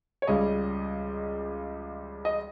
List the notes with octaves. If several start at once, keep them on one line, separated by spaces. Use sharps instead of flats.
C#5
C#2 C#3 G3 D#5
D#5